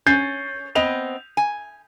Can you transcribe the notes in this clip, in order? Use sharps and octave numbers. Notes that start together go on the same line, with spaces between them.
C#4 G6 A6 C7
B3 C4 D#5 F7
G#5